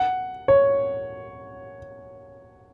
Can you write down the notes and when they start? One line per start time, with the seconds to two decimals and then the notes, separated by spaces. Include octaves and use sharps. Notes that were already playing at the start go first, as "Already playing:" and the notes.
Already playing: F#5
0.48 C#5